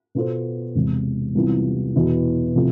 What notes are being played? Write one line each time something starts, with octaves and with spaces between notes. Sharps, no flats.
B2 B3 F4 A4 C5
E1 E2 C3
C2 C3 E3 B3 F4
E2 B2 B3 E4
C3 F3 A3